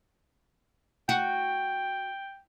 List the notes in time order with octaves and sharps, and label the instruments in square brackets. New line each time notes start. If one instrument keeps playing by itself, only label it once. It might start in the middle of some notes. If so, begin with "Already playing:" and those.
[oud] F#4 [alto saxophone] G5